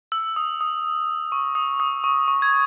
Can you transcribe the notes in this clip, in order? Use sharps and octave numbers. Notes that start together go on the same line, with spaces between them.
E6
D#6
D#6
C#6
D#6
D#6
C#6
C#6
G#6